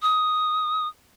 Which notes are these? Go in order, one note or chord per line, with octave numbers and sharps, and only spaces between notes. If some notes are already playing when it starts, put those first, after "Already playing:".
D#6